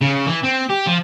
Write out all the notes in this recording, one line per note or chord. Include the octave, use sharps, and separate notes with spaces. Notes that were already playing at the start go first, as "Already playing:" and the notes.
C#3
E3
C4
G4
F3